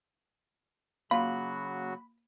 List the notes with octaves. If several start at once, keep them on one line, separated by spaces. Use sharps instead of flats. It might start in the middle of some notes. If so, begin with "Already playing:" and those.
C#3 F#3 A#3 F4 F#4 B5